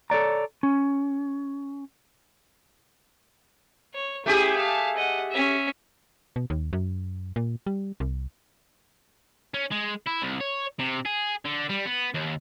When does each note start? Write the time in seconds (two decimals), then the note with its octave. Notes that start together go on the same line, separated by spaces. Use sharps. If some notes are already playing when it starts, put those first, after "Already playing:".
0.10 A4 C#5 D5 A#5
0.63 C#4
3.94 C#5
4.26 A3 C#4 E4 G4 G#4
4.56 F5 A5
4.96 D#5 F#5
5.30 C#4 E5
6.36 B2
6.50 D#2
6.73 F#2
7.36 A#2
7.66 G3
8.00 C2
9.54 C#4
9.71 G#3
10.07 E4
10.22 C2
10.40 C#5
10.79 C3
11.05 G#4
11.45 D3
11.69 G3
11.86 B3
12.14 D#2